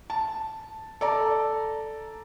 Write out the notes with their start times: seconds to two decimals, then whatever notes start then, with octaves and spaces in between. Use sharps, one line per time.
0.10 A5
1.01 A4 D5 A#5